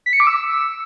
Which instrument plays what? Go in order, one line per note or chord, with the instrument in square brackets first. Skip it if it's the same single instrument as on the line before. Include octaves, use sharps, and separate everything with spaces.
[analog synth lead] B6
C#7
D6
E6